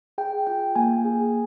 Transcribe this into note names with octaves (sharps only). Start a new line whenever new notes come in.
G#4 G5
F4 G5
A#3 G#5
G#4